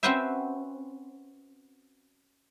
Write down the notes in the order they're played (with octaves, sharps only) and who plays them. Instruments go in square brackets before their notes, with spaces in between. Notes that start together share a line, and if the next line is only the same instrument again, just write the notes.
[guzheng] C4 C#4 F#4 B4 C5 E5